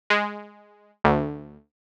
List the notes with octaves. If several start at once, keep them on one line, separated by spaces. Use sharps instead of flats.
G#3
D2